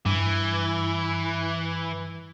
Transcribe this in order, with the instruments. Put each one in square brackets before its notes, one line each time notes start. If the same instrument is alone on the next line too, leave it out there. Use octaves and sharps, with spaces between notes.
[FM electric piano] G2 [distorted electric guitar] E3